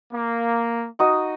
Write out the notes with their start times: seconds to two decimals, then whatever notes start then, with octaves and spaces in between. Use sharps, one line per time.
0.12 A#3
0.99 D#4 F#4 D#5